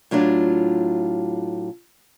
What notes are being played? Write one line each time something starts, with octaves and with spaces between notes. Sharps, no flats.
A2 F#3 D4 F4